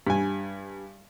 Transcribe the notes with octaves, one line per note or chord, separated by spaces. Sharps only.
G2 G#5